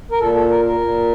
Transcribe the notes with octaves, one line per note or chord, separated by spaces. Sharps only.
A#4
A#2 A4
A4
A#4
A#4
A#2